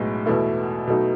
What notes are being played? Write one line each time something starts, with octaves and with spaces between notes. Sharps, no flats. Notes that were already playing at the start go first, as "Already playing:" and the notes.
Already playing: B1 A2 G#3 B3
E2 B2 A3 E4
B2 F#3 A3 D#4